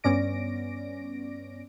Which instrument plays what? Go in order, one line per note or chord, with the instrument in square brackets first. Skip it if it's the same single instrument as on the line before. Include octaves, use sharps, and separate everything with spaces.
[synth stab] G2 B3 C#4 D5 A#6 D7